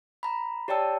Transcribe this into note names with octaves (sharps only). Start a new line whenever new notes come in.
A#5 B5
G4 C#5 D5 G5 A5 E6